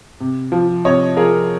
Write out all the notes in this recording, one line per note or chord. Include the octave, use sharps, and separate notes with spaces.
C3
F3
C3 C#5 D#5
F3 G#4 A#4